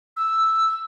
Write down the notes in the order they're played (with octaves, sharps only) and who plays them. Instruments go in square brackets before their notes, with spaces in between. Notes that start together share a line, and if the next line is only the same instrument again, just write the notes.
[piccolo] E6